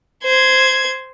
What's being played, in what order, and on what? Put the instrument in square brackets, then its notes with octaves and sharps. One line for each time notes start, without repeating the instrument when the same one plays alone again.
[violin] C5 G#6